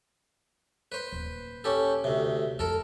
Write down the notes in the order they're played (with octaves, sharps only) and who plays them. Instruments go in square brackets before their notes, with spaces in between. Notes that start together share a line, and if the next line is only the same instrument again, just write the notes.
[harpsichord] B4 C5
[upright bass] D#1
[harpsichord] C#4 G4 A4
D2 C3
[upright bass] F2 [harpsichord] A4 A#4 A5